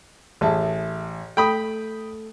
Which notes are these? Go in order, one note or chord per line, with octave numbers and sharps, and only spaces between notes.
A1 G#4 E5 A5
A3 G5 B5 D#6